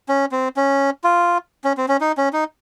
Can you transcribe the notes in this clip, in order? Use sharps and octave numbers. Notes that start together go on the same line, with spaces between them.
C#4
C4
C#4
F4
C#4
C4
C#4
D#4
C#4
D#4